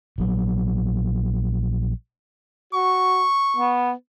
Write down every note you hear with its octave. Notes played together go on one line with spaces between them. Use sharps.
A#1 F#3
F#4 C#6
B3